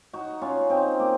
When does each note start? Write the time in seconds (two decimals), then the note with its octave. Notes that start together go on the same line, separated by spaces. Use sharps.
0.13 D#4 F#4
0.41 C#4 F4
0.70 C4 D#4
0.99 A#3